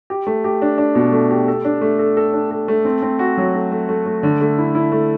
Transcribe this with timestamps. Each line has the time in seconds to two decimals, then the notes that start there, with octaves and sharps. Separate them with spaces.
0.10 G4
0.27 A3
0.44 G4
0.62 D4
0.78 D4
0.95 B2
1.12 A3
1.31 G4
1.48 A4
1.65 D4
1.81 A3
1.99 A4
2.17 A4
2.33 D4
2.51 A4
2.68 A3
2.85 C4
3.02 C4
3.19 F#4
3.38 F#3
3.55 A3
3.72 A3
3.89 A3
4.06 A3
4.23 D3
4.41 A3
4.58 E4
4.75 E4
4.92 A3